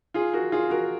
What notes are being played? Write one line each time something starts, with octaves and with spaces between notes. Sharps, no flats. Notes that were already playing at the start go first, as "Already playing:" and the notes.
F4 G#4
F#4 A#4
F4 G#4
F#4 A#4